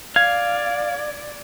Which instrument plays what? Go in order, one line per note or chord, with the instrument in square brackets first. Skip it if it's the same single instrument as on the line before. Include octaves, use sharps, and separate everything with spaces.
[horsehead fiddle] D5 [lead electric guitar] F5 [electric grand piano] G#6